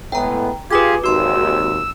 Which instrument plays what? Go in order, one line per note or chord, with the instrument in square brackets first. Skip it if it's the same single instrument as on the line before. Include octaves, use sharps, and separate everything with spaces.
[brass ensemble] A2 G#3 B3 [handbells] G5 A#5
[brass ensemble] F4 G#4 [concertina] G4 [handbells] B4 D6 G#6
[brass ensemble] G#1 D#2 [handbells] F#4 C6 [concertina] E6